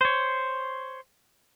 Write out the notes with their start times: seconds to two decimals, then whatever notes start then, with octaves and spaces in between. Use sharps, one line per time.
0.01 C5 C#5